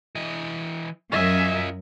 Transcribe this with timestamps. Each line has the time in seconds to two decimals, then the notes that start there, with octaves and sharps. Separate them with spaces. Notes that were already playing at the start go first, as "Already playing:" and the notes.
0.15 E3 D#5
1.12 F#2 F4 A#4 D#5 E5 G#5